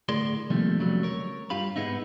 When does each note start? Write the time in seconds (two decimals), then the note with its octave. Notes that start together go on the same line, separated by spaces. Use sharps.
0.09 D2 A2 G#4 A#4 D5 C6
0.50 C3 D#3 F3 G3 A3 A#3
0.79 F2 C#3 F#3 G3 A3
1.03 A#4 C#5
1.50 G2 F4 G4 F5 B5
1.76 G#2 G#3 B3 D#4 E4